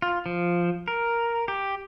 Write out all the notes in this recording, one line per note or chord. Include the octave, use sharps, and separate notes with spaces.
F4
F3
A#4
G4